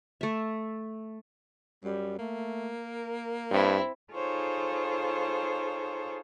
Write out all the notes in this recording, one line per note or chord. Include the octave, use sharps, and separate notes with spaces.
A3 E5
F#2 G3
A3 A#3
A#4
G2 C4 E4
D#4 F4 G#4 A4 C5 C#5